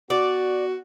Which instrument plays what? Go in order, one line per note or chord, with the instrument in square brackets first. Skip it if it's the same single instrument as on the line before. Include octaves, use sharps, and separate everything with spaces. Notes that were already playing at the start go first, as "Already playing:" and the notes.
[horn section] B3 F#4 [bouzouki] D5